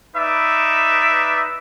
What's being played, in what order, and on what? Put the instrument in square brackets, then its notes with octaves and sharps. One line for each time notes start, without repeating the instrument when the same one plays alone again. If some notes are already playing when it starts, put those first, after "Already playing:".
[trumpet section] D#4 B4 D5 E5